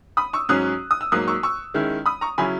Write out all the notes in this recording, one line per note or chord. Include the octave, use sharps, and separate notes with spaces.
B5 D#6
C#6 E6
G#2 F#3 C#4 D#6 F#6
D#6
E6
G#2 F#3 A#3 D#6 F#6
C#6 E6
C#6 E6
D#3 G#3 C#4 E4
B5 D#6
A#5 C#6
C#3 F#3 C#4 E4 G#5 B5